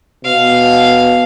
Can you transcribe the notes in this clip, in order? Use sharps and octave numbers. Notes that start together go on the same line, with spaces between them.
B2 F5